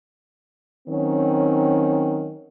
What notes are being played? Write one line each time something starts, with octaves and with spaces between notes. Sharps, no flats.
D#3 F#3 C4 C#4